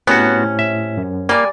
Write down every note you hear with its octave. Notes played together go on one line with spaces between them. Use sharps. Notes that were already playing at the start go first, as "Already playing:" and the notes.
A2 C3 B3 C#4 F#4
E5
F#2
G3 A#3 D5 G#5